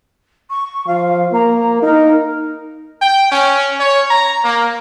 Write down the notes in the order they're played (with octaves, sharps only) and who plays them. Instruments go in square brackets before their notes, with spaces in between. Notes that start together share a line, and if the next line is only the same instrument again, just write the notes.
[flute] C#6
[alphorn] F3 [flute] F5
[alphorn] A#3 [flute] A#5
[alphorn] D#4 [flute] A#4
[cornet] G5
C#4
C#5
A#5
A#3